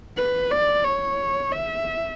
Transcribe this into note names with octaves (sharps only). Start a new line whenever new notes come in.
B4
D5
C#5
E5